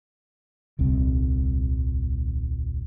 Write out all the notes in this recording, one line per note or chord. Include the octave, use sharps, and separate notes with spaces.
D#1 C2 C4